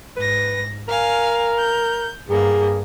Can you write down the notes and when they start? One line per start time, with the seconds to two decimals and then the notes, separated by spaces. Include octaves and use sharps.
0.17 G#2 B4 A#6
0.88 A#4 F5 G#5
1.58 G6
2.30 G2 A#3 G#4